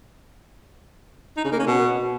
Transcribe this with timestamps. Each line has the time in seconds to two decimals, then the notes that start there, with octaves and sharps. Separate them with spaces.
1.37 D#4
1.45 C#3
1.52 A#3
1.60 C#4
1.67 B2